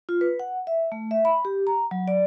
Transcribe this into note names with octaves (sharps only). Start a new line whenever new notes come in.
F4
B4
F#5
E5
A3
E5
B5
G4
A#5
F#3
D5